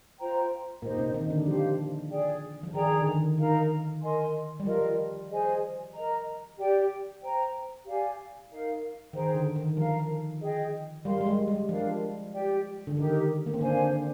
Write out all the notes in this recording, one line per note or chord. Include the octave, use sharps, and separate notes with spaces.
F4 C5 G5 A#5
A#2 A#3 D#4 G4 C5 D#5
C3 C4
D#3 D#4
D3 D4
F3 G4 C5 F5
G#4 D5 G5
F3
D#3 G#4 D5 G5 A#5
D3
D#3
D#3 D#4 A#4 F5 A#5
A#4 D#5 G#5 C6
G3
F3 F4 A#4 D#5
G#4 C5 D#5 G#5
A#4 D#5 A#5
G4 D5 G5
C5 G5 A#5
G4 D5 F5 G#5
D#4 A#4 F5
D#3 G#4 C5 G5 A#5
D3
D#3
F3 A#4 F5 A#5
G#4 D#5 G5
G3 A#4 F5 C6
G#3
G3
G3
F3 D4 F4 A#4 F5
G4 D5 G5
D3
D#3 D#4 G4 A#4
A#3
C4
D3 D4 C5 F5 G#5
D3 D4
D4